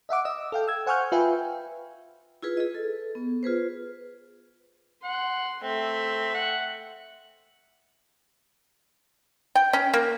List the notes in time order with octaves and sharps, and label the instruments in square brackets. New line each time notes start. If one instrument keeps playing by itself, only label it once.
[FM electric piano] D#5 E5 F#5 D6
D#5 E6
A4 F5 G5
E6 G#6
C5 F#5 G#5 C#6 F6 G6
F4 B4 E5 F5 G5 G#5
[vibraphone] E4 F4 G#4 B4
G#4 D#5
A4
B3
F4 G#4 B4 C5
[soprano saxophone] F#5 [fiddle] C6
[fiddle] A3 E5 [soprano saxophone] C4
[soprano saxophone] F#5
[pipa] G5
C#4
A#3